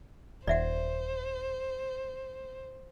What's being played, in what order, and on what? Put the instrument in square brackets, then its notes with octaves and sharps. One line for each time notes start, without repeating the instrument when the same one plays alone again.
[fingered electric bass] D#1 [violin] C5 [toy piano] D5 E5 F#5